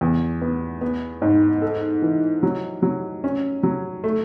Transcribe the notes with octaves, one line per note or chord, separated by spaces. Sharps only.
E2
B3
B3
G#2
A4
E3
F#3
F#3
C#4
F#3
A3